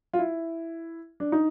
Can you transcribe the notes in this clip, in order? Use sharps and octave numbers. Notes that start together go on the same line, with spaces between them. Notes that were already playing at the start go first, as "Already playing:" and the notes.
F4
E4
D4
D#4